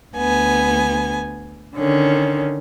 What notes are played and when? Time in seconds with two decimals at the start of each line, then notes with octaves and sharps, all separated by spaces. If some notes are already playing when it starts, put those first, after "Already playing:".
0.15 D2 B3 G#5
1.76 D3 D#3 C#4